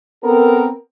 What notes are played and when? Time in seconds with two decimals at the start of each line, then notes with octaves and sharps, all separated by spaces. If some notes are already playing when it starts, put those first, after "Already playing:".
0.24 B3 C4 A4 A#4